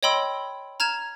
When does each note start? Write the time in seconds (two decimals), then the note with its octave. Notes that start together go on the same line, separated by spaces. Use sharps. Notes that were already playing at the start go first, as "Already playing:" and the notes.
0.03 C#5 D#5 G5 B5 C6 E6
0.80 A#5 F6 G#6 E7